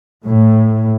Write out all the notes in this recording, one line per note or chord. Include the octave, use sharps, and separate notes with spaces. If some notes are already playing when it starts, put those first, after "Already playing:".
A2